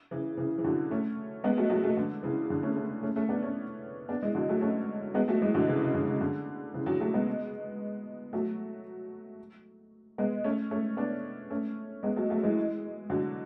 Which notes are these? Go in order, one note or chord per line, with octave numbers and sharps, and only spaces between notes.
C#3 E3
C#3 E3
E3
D3 F#3
A3 C#4
G#3 B3
F#3 A3
F#3 A3
F#3 A3
D3
C#3 E3
D3
A3 C#4
A3 C#4
A3 C#4
A3 C#4
B3 D4
A3 C#4
B3 D4
E3 G#3
D3 F#3
F#3 A3
A3 C#4
G#3 B3
F#3 A3
E3 G#3
D3 F#3
C#3 E3
C#3
D3
C#3
D3
C#3 E3
D3 F#3
F#3 A3
G#3 B3
F#3 A3
G#3 B3
A3 C#4
A3 C#4
B3 D4
A3 C#4
G#3 B3
F#3 A3
F#3 A3
E3 G#3
D3 F#3